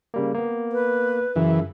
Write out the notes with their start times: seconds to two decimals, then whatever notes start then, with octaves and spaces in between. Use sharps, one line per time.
0.14 C#3 G3 A#3
0.34 A#3 B3
0.72 B4
1.36 F#2 C#3 E3